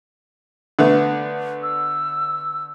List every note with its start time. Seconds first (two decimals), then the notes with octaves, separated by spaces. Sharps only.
0.79 D3 A3 B3
1.63 E6